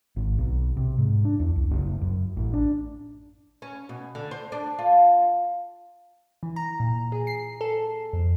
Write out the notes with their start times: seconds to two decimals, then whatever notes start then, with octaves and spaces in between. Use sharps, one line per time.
0.16 G#1
0.38 B1
0.77 C3
0.98 G#2
1.25 D4
1.40 E2
1.56 C2
1.71 F#1
2.01 F#2
2.37 A1
2.53 D4
3.62 C#4
3.89 B2
4.15 D3
4.31 C5
4.52 D4
4.79 F4
6.43 E3
6.56 A#5
6.80 A#2
7.12 G#4
7.27 C7
7.61 A4
8.13 F2